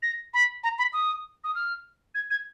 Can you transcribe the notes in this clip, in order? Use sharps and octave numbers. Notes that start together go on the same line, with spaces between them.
A#6
B5
A#5
B5
D#6
D#6
F6
G#6
G#6